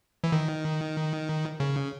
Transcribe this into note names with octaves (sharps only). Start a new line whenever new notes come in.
E3
D#3
C#3